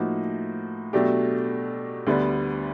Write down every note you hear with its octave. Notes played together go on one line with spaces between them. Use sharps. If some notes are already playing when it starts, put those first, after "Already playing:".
Already playing: A2 F3 A#3 D#4 F#4
B2 F#3 A3 D4 G4
D2 D3 G3 B3 D4